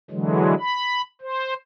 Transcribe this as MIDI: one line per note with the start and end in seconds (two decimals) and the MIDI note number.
0.11 0.54 50
0.11 0.54 52
0.11 0.54 54
0.11 0.54 56
0.59 1.01 83
1.21 1.54 72